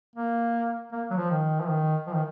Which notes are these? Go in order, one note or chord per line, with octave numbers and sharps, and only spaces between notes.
A#3
A#3
F#3
F3
D#3
F3
D#3
F3
D#3